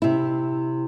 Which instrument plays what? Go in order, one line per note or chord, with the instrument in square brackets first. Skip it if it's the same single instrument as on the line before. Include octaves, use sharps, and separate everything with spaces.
[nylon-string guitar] C3 E4